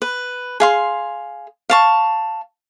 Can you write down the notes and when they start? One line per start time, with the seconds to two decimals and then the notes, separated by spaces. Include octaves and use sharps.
0.02 B4
0.60 G#4 F5 C6
1.70 F5 A5 C#6